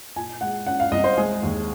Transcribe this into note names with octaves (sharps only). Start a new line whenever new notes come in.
A#2 G#5
G#3 F#5
C#4 F#5
F5
C2 D#5
C5
G#3 G#4
D#2